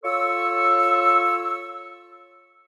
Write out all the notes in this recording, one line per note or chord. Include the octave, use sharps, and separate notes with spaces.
F4 A4 C#5 C#6 E6